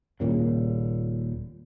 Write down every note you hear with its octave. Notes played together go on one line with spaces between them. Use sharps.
D#1 A#2 C#3